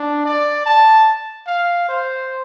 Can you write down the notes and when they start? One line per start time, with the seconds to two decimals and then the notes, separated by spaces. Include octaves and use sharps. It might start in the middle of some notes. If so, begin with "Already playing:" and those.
Already playing: D4
0.25 D5
0.66 A5
1.47 F5
1.89 C5